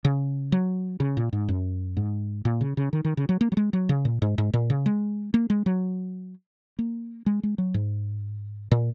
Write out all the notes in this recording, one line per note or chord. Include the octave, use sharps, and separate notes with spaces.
C#3
F#3
C#3
A#2
G#2
F#2
G#2
A#2
C#3
C#3
D#3
D#3
C#3
F#3
A#3
F#3
G#3
F#3
C#3
A#2
G#2
G#2
A#2
C#3
G#3
A#3
G#3
F#3
A#3
G#3
G#3
F#3
G#2
A#2